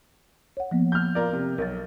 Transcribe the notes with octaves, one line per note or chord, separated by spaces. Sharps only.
C#5 F#5
F3 A#3 B3
F6 G6
F4 A#4 D5
C3
B1 A#4 A6